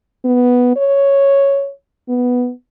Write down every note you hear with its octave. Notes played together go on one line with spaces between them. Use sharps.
B3
C#5
B3